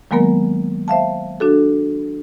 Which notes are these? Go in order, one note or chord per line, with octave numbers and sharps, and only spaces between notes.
D#3 F#3 G#3 A#3 B3 A#4
C5 E5 F5 A5
D4 F#4 A4